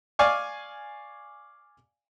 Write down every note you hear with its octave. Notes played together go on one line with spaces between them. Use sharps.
D5 F5 G#5 C#6 D6